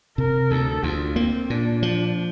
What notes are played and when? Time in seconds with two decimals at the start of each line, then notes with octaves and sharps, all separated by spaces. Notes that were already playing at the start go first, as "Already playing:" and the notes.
0.18 C3 A#4
0.51 D2 A4
0.83 D2 F4
1.16 A#3 C4
1.50 A#2 D4
1.83 F3